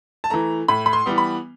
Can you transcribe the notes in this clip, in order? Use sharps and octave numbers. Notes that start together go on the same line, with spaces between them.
A5
E3 A3 A#5
A2 B5
B5
C6
E3 G3 B3
B5